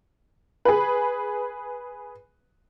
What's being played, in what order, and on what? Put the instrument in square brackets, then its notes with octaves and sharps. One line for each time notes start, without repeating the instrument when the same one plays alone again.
[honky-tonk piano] G#4 B4